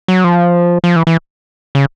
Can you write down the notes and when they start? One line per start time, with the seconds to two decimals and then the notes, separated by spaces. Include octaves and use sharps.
0.08 F#3
0.24 F3
0.84 F3
0.96 E3
1.07 E3
1.75 C#3